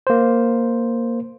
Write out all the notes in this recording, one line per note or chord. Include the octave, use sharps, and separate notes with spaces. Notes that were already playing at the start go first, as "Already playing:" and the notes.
A#3 C5